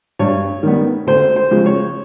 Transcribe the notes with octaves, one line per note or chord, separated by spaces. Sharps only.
G2 C#5
D#3 G3 B3
D2 C5
C5
C#3 F3 G#3
C#5